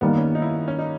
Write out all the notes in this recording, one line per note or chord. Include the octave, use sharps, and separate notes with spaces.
D#3 G3 A#3 B3
C#4
D#4
E4
C#4
D#4